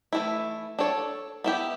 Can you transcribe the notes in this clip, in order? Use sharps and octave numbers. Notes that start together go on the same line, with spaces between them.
E3 A3 E4
D4 A4 C#5
B3 E4 G4